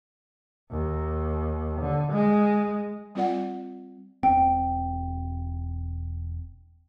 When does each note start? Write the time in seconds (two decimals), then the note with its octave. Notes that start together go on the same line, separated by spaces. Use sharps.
0.71 D#2
1.81 D3
2.12 G#3
3.15 G3 C4 F4 D5 F#5
4.23 E1 C4 G5